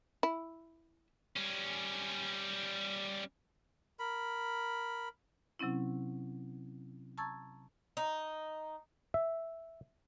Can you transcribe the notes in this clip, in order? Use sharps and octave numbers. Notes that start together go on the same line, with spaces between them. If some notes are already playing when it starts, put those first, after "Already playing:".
E4
G3 C#4
A#4 B5
C3 F#3 C4 C#4 E4
A5 A#5 C#6 E6 G#6 A6
D#4
E5